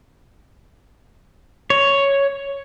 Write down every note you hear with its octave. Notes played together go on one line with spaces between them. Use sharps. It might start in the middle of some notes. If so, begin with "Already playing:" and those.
C#5